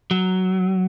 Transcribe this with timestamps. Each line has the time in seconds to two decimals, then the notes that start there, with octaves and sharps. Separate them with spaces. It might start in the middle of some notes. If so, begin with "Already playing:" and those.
0.11 F#3